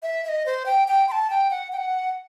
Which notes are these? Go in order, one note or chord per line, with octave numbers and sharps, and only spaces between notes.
E5
E5
D#5
C5
G5
G5
C6
A5
G5
F#5
G5
F#5